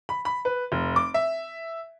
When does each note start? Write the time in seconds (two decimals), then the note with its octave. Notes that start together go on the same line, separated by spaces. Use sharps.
0.09 B5
0.25 B5
0.45 B4
0.72 F1
0.96 D6
1.14 E5